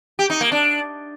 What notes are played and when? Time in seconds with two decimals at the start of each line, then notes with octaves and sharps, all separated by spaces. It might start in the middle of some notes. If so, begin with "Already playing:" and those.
0.19 G4
0.30 D#4
0.41 A#3
0.52 D4